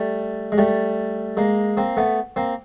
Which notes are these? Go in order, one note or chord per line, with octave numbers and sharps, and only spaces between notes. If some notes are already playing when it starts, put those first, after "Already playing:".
Already playing: G3 A3
G#3
G3 A3
G#3 A#3
A#3 C4
A3 B3
A#3 C4